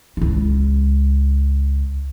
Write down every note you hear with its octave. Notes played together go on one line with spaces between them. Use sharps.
C#2 E4